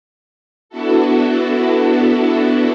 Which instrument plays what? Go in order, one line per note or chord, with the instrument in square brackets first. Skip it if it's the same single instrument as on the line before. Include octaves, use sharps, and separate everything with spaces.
[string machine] B3 D4 E4 F#4 A4